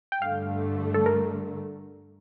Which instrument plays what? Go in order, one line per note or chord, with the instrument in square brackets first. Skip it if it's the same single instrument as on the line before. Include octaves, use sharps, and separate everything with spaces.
[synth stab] G5
[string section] G2 D3 A3 [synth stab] F5
[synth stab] A4
A#4